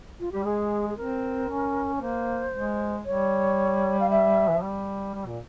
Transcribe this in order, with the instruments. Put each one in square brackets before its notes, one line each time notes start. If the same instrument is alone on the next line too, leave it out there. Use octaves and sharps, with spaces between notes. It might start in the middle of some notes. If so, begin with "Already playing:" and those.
[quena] F4
[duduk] G3 [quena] G4
[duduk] G#3 [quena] G#4
[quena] G#4
[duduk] C4 [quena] A#4
[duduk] C#4
[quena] C#5
[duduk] A#3 [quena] C5
[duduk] G#3
[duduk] G3 [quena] C#5
[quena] F5
E5
[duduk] E3
F3
G3
G3
A#2